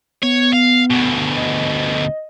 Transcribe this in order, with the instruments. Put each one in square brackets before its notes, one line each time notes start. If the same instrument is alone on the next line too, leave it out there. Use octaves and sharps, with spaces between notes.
[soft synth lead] B3 [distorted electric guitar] C#5
[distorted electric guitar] F5
D2 B2
[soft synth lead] D#5